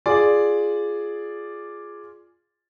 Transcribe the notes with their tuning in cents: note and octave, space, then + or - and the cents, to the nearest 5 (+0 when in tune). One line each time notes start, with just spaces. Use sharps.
F4 +0 G#4 +5 D5 +0